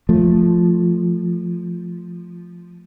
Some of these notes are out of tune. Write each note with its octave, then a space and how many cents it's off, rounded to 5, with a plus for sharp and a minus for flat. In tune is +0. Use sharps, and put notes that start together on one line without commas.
F3 +0 A3 +0